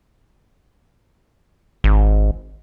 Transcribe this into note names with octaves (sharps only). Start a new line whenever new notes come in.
G#1